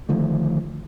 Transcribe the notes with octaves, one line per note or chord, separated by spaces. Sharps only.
D3 D#3 F3 A3